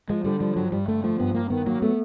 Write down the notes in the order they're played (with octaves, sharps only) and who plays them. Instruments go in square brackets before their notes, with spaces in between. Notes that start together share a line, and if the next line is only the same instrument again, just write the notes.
[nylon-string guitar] F3 [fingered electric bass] G#3
[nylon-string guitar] D3 [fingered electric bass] G3
[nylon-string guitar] F3 [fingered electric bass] G3
[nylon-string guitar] G2 [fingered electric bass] F#3
[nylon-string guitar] G2 [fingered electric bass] G3
[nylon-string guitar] D3 [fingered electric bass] A3
[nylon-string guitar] F3 [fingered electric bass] A3
[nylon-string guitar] G2 [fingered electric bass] B3
[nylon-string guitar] G2 [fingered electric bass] A#3
[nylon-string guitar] D#3 [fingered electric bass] B3
[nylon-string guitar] F#3 [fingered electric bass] A#3
[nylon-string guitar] A3 [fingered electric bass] B3